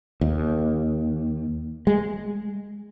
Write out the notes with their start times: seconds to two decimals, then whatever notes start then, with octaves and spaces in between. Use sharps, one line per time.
0.21 D#2
1.87 G#3